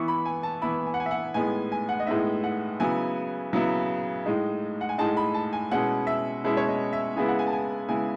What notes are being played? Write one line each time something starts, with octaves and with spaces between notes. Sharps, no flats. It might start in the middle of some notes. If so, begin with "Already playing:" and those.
Already playing: E3 B3 E4 C#6
B5
G#5
A5
E3 B3 E4 B5
G#5
F#5
G#5
E5
F#5
A2 G#3 B3 D#4 G#5
G#5
F#5
D#5
A2 G#3 B3 D#4 E5
F#5
C#3 F#3 B3 E4 G#5
C#3 F#3 B3 E4
A2 G#3 D#4
F#5
G#5
A2 G#3 D#4 A5
B5
A5
G#5
B2 G#3 C#4 E4 F#5
E5
B2 G#3 C#4 E4
C#5
D#5
E5
C#3 G#3 B3 E4 G#5
F#5
G#5
A5
G#5
C#3 G#3 B3 E4 G#5